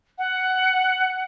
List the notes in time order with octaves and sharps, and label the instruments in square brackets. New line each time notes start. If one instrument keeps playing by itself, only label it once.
[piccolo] F#5